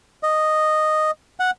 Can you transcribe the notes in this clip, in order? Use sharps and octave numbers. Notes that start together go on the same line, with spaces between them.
D#5
F#5